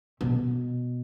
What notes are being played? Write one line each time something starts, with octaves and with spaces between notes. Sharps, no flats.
B2